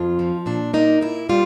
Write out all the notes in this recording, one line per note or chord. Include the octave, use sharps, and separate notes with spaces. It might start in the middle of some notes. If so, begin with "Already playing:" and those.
Already playing: F2 F4
F3
A#2 D4
A#3 D#4
A#2 E4
G3 F4